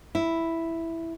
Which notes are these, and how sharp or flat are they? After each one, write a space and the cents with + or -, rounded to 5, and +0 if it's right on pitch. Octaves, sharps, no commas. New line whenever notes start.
E4 +0